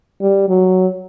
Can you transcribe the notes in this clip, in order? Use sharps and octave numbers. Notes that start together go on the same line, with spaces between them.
G3
F#3